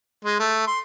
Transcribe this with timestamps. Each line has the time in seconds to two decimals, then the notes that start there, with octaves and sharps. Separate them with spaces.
0.25 G#3
0.39 A3
0.67 C6